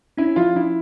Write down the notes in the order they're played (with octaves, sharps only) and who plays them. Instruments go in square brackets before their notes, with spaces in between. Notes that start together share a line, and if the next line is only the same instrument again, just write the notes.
[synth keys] C#4 [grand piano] E4
[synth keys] F3 [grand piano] F4
[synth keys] F3 [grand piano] E4